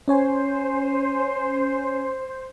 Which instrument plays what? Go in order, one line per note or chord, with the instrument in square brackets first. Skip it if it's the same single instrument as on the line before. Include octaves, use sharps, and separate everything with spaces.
[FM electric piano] C#4 C#5 G#5 [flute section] C5